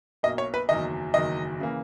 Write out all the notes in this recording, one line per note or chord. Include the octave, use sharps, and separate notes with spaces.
B1 B2 A#3 D#5
C#5
B4
F#1 E2 D#3 F#3 D#5
F#1 E2 D#3 F#3 D#5
C#3 E3 A#3